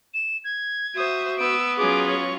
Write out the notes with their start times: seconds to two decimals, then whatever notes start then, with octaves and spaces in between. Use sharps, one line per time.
0.14 E7
0.44 G#6
0.95 F#4 C5 E5 D#6
1.38 B3 E6 D7
1.77 F#3 C#4 F4 G#4 D6
2.07 C#6